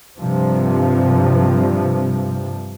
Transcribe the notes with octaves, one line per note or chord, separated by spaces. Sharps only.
G2 C3 F3